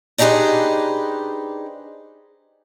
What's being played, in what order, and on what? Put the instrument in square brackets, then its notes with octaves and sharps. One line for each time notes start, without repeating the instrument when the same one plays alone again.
[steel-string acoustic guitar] D4 D#4 G4 G#4 B4 C5